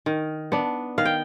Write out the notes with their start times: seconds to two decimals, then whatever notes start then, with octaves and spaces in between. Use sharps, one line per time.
0.06 D#3
0.52 B3 D4
0.98 D#3 F5
1.05 G5